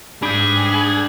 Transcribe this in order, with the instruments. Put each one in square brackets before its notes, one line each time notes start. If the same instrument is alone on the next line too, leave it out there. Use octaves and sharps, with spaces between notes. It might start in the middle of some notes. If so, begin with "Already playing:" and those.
[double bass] G#2 [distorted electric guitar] D4 G5 [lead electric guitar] G#4 [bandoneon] B5